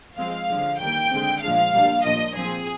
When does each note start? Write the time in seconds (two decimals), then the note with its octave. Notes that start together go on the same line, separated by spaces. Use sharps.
0.18 F3 G#3 C4 F5
0.50 D3 F3 G#3
0.80 D#3 G3 A#3 G5
1.12 D3 G#3 C4
1.42 A#2 F3 G#3 D4 F5
1.74 A#2 G3 A#3 D4
2.04 A#2 F3 A#3 D4 D#5
2.36 F3 C4 G#4